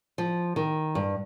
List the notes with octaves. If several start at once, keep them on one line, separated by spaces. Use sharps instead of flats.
F3
D#3
G2